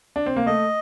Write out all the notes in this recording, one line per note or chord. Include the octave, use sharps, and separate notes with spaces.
D4
C4
A#3
A3 D#5